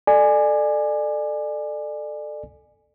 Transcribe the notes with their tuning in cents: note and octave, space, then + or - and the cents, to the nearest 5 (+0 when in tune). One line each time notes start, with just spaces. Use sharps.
A4 +0 D5 +30 G#5 +0